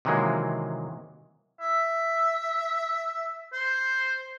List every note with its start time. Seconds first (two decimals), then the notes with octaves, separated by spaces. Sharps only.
0.05 C3 D#3 E3 F#3 G#3 A#3
1.61 E5
3.53 C5